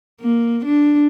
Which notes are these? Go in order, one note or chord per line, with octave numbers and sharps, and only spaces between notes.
A#3
D4